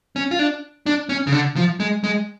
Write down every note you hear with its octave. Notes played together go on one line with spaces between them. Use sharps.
C#4
F4
D4
D4
C#4
C#3
D3
F3
G#3
G#3